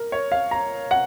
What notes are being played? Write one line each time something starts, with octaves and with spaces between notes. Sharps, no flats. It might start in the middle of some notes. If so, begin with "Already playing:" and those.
Already playing: A#4
C#5
F5
A#5
F#5